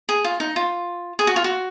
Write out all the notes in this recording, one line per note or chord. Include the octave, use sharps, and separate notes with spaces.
G#4
F4
D#4
F4
G#4
F#4
F4
F#4